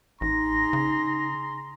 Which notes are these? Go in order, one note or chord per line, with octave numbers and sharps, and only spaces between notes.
A1 D#4 G#4 A#5 C6 A#6
C#3